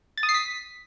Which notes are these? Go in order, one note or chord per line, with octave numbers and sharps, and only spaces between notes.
A6
D#6
C7
B6